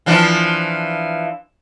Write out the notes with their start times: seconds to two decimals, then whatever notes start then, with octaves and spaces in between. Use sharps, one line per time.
0.06 E3 F3 D4